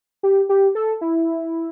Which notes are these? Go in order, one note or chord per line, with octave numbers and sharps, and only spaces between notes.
G4
G4
A4
E4